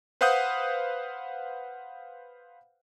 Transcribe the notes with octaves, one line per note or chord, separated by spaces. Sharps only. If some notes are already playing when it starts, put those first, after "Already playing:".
B4 C5 F5 F#5 D#6 G6